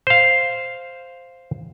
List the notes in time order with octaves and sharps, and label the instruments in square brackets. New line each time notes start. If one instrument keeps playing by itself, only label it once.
[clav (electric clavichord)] C5 F5